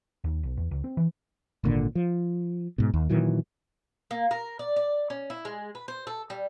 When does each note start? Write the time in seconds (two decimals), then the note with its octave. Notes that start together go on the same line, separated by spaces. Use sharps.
0.24 D#2
0.43 B1
0.57 E2
0.71 C#2
0.84 C4
0.97 E3
1.64 G#1 A#2 D3
1.95 F3
2.78 G#2 B2
2.94 D#2
3.09 A#2 D#3 E3 F#3
4.11 A#3
4.31 A#4
4.59 D5
4.76 D5
5.10 C#4
5.30 E4
5.45 G#3
5.75 B4
5.88 C5
6.07 A4
6.30 G3